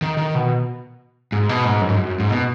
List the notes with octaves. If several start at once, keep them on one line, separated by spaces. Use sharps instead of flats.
D#3
D#3
B2
G#2
B2
G#2
F#2
G#2
F#2
G#2
B2